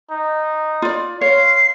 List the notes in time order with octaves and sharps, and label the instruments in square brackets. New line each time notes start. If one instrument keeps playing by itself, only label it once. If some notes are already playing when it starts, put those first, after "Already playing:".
[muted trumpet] D#4
[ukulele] F4 D5
[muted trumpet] F4 [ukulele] C#5 [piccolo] C7